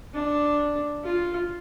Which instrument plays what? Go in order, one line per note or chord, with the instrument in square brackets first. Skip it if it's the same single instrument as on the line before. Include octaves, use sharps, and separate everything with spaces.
[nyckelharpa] D4
F4